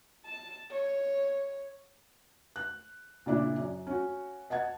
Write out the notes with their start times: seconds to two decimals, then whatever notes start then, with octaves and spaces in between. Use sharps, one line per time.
0.25 A5
0.71 C#5
2.56 F#6
3.26 A#2 C#3 D4 E4
3.57 F#2
3.87 C#4 F#4
4.50 D#5 F#5 A5 G#6